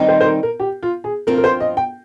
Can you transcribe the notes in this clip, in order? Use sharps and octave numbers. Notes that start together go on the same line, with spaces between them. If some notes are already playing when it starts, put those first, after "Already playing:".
Already playing: D#3 G3 C4 D#4
C5
C5
A#4
A#4
G4
F4
G#4
G2 F3 C4 F4 A#4
A#4
C5
D#5
G5